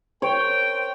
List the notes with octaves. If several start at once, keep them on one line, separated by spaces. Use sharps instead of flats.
A#4 C5 C#5 G5